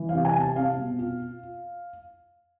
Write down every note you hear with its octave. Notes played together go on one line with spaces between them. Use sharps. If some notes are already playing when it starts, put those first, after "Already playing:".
Already playing: E3
F5
C3
G#5
C3
A5
C4 F5
B2
F4